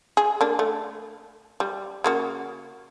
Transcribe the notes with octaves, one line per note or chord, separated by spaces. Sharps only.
G#4
A#3 D4
A3
G3
C#3 A#3 F#4